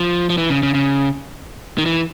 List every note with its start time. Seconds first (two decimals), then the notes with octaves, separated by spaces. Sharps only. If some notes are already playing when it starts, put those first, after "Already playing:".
Already playing: F3
0.30 F3
0.38 E3
0.50 C#3
0.63 C#3
0.74 C#3
1.78 D#3
1.86 E3